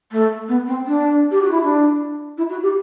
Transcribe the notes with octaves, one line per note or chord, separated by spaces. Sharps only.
A3
B3
C4
D4
G4
F#4
E4
D4
E4
F#4
G4